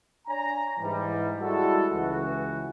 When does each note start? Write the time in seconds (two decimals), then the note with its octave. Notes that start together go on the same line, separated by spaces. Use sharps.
0.27 D4 C#5 G#5 A#5
0.80 G#2 E3 G3
1.41 G3 G#3 E4 F#4 A4
1.93 C#2 E3 F#4